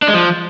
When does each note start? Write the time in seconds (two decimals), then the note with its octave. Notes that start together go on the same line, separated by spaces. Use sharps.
0.02 D4
0.08 G#3
0.14 F3